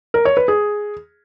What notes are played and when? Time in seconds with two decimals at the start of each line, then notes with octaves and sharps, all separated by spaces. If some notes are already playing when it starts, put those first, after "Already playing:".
0.14 A#4
0.25 C#5
0.37 B4
0.48 G#4